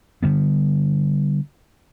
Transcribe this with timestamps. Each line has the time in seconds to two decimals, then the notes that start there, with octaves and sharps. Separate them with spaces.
0.23 D3 G3 B3